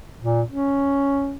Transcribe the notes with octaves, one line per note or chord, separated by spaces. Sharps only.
A#2
C#4